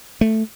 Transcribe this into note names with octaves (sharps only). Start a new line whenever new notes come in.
A3